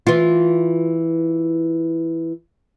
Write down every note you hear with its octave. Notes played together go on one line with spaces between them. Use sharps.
E3 F4